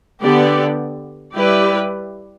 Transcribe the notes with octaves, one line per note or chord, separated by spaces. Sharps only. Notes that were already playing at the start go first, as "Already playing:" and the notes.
D3 B3 G4 D5
G3 E4 G4 B4 D5